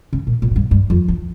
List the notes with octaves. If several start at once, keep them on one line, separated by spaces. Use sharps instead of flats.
C#3
A#2
A#2
A2
G2
G2
F2
E3